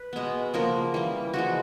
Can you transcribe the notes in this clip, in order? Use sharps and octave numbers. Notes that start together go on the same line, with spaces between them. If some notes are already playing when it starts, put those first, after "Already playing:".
Already playing: B4
B2 G#3 B3
C#3 F3 A#3 A#4
E3 G3 A#3
C#3 F3 G#3 F#4